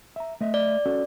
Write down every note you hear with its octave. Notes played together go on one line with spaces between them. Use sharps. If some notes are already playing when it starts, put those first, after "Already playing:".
E5 A#5
A3 D#5 E5
D5
C#4 F#4 A4